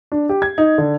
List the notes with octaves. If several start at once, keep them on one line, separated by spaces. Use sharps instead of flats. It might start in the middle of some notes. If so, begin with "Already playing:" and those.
D4
G4
G#6
D#4
D3